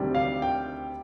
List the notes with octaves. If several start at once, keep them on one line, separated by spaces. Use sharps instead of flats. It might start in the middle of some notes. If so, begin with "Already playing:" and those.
Already playing: D2 C3 D#3 G3
F5
G5